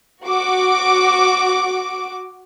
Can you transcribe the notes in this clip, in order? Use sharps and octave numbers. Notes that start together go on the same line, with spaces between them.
F#4 D6